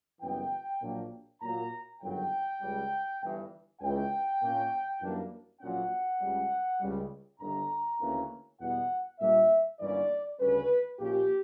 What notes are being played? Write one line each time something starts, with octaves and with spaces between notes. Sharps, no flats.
F#1 F#2 E3 G3 B3 G5
A#1 A#2 F#3 A#3 D4
A#2 F#3 A#3 A#5
G1 F#2 C#3 F#3 G5
C#2 C#3 G3
G1 G2 E3
C#2 C#3 E3 G5
A#2 A#3 C#4
F#2 E3 G3 A#3 D4
A#1 A#2 F#3 C#4 F#5
C#2 C#3 G3 C#4
C#2 C#3 G3
G1 G2 D3 A#5
D2 C#3 E3 A#3 C#4
E2 B2 G3 B3 F#5
A#2 G3 A#3 D4 E5
G1 G2 E3 A#3 C#4 D5
D2 C#3 G3 C#4 B4
A#1 A#2 A#3 C#4 G4